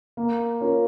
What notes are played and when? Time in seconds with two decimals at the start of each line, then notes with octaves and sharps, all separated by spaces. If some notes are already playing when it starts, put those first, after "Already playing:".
0.17 A#3
0.61 C#4 F4 A#4